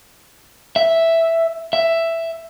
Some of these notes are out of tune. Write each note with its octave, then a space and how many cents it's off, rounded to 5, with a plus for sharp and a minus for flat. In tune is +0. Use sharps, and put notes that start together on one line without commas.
E5 +0
E5 +5